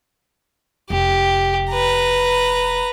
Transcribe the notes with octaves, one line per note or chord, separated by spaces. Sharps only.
F1 G4
B4 A#5